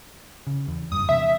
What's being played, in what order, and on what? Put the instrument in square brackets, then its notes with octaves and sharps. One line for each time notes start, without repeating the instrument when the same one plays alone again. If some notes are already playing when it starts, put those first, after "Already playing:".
[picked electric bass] C#3
E2
[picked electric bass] F1 G2 [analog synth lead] D#6
[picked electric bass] E2 C3 [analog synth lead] E5